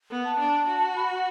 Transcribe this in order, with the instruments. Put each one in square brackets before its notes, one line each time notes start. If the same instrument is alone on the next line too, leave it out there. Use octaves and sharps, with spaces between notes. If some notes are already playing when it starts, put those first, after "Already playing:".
[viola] B3
[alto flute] A5
[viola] D4
F#4
[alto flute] B5
F#5